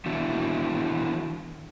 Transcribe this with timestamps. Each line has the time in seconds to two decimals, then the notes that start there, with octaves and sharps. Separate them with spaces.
0.06 D#3 E3 B3 D4 E4 F#4